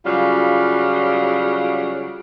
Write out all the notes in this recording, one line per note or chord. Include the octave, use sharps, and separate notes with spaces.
C#3 F#3 G3 F4 F5